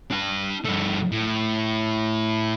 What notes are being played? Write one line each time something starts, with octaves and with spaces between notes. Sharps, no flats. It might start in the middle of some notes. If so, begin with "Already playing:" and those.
D4 G5
G2 A3
A2